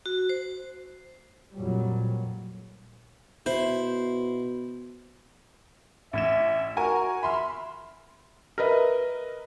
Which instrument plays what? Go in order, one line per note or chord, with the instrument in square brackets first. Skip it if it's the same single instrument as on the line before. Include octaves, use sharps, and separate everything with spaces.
[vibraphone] F#4
C5
[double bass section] F2 A#2 F#3 G3
[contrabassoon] B2 [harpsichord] E4 [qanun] C5
[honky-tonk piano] A1 G#6 E7 [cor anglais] E5
[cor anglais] F#4 [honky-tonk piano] A#4 G#5 A#5
[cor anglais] E5 [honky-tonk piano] B5 C6 F6
[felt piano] A#4 B4 D#5 E5